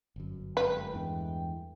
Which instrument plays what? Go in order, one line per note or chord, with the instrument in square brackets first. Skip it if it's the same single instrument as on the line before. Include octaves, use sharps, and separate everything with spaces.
[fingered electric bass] G1 F#2
[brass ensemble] G#3 A3 G5 [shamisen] B4
[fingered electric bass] E2 G2 E3